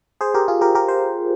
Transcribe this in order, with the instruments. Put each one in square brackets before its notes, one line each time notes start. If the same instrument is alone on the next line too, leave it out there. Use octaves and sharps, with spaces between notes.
[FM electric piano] G#4 C5
G4 A#4
F4 G#4
G4 A#4
G4 A#4
C5